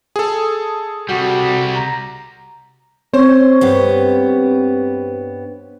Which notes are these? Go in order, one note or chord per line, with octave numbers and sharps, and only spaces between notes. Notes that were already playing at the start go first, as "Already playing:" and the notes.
G#4 A4
C2 G3 F#4
A#5
C4 C5 C#5
G2 B3 G4